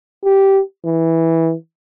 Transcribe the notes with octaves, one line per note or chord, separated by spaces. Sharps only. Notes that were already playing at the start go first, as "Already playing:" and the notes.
G4
E3